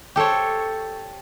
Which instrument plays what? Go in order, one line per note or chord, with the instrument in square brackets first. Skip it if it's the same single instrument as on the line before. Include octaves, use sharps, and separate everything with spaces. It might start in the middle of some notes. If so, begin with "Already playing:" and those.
[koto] G4 A4 C5 C#5